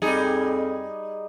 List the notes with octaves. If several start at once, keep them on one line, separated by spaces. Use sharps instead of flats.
F2 G3 D#4 G#4